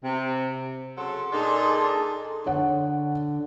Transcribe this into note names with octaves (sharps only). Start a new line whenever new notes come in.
C3
C#3 F#3 A4 C6
A#2 D4 D#4 G#4 A4
D3 C#5 F#5